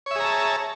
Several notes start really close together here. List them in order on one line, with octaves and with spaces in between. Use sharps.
C#5 E5 G#4 A#5 A5